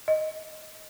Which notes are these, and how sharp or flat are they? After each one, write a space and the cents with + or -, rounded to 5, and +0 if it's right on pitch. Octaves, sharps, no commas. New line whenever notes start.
D#5 +5